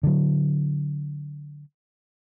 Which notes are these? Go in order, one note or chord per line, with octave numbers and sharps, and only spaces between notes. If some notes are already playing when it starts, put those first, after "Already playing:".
D3 F#3